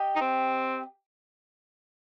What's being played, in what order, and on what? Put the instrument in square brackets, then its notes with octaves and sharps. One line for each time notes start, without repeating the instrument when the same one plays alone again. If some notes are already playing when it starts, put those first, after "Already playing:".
Already playing: [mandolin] G4 D#5
[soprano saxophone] D#4
C4